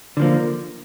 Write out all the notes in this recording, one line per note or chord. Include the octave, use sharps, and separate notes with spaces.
D3 F3 A#3